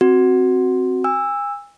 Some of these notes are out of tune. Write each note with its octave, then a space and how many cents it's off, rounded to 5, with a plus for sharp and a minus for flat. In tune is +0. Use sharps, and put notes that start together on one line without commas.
C4 +0 F#4 +0
G#5 -35 E6 +0